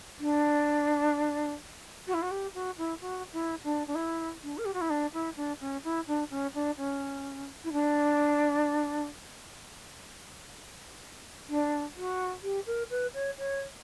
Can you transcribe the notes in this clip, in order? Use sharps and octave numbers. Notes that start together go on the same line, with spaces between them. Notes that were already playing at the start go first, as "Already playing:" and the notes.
D4
F#4
E4
F#4
G4
F#4
E4
F#4
E4
D4
D4
E4
D4
A#4
G4
F#4
E4
D4
E4
D4
C#4
E4
D4
C#4
D4
C#4
E4
D4
D4
F#4
G4
A#4
B4
C#5
C#5